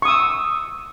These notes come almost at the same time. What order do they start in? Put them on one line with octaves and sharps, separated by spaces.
C#6 D#6 E6